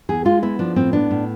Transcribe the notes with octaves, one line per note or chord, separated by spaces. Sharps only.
E2 G#4
G#3 F4
B3 E4
F3 D4
A2 C4
B3 D4
A2